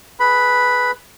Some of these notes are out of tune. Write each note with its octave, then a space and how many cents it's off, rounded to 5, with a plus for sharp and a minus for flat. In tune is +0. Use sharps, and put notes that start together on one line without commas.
G#4 +20 B4 +0 B5 +0